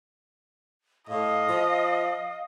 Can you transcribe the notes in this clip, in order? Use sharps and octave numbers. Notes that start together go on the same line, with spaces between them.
A2 D#5 F5
F3